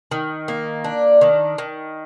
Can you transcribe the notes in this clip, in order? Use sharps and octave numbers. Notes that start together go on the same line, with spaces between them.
D#3
A#3
D4
D#3
D#3